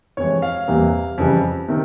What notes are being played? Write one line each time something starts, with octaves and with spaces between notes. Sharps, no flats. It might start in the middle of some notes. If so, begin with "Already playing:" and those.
F2 C3 E3 G#3 C#5
F5
E2 C3 E3 G3 A#3
F2 C#3 E3 G3
C3 D#3